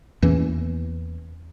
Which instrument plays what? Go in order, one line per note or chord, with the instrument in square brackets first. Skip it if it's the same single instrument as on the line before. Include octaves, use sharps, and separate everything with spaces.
[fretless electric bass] E2 E3 A#3 C#4